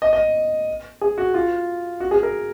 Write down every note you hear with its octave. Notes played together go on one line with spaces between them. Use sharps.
D#5
D#5
G#4
F#4
F4
F#4
G#4
A#4